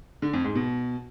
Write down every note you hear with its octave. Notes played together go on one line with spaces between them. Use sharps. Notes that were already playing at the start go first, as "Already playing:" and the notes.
D3
F2
G#2
B2